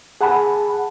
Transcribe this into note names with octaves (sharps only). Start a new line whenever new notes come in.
G#4 F#5 A5 B5